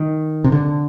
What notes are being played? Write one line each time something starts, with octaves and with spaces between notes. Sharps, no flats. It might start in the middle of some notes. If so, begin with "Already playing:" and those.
Already playing: D#3
C3
D3